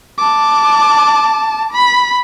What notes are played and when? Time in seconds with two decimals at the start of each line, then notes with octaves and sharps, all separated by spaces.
0.18 A5 D6
1.73 B5